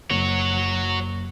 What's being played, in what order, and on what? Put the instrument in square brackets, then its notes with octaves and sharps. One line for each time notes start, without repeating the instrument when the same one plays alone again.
[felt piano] F#1 [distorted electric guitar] F#4 C#5